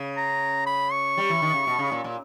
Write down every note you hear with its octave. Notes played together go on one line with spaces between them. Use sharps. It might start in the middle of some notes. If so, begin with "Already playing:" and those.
Already playing: C#3
A#5
B5
C#6
G3
E3
D#3
C#3
B2
C#3
A#2
A#2